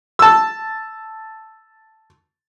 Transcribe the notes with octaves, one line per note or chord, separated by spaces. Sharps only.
A5 E6